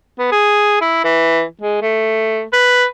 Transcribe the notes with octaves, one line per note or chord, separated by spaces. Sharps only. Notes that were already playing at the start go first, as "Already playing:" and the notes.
B3
G#4
E4
E3
G#3
A3
B4